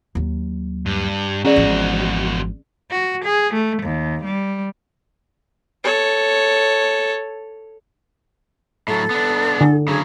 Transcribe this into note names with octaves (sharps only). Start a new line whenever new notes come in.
D#2 F#3
G2
E2 C#4 F#4 G#4 D5
G#1 F3
F#4
G#4
A3
D#2
G3
A4 C#5
A2 F#3 A4
B3 D4
D3
C#3 F#3 G#4